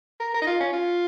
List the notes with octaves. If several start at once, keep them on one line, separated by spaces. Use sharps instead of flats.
A#4
A#4
D#4
F4
C#4
F4